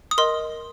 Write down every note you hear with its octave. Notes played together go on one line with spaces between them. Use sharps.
D#6
A#4 D#5 C6